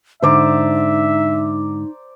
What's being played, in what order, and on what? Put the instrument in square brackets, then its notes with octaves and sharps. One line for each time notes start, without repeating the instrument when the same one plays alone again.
[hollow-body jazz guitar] G#2 D3 [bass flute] D#4 [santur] C5 D5 A#5 [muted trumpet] E5